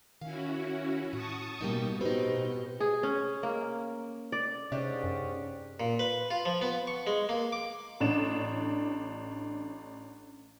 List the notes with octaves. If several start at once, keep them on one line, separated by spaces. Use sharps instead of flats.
D#3 C#4 E4 F#4 F5
A2 F#4 A5 C#6 D#6
B2 G3 A#3 D#4
C4 D#4 F#4 G4 B4
G#4
C#4
A#3
D5
G#2 C3 C#4 D4 G4 D#5
F#2
A#2
B4
F4
F3
B3
C#6
G#3
A#3
D6
A1 D4 E7